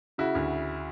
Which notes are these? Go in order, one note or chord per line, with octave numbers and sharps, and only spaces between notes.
C#3 E4 F#4
D2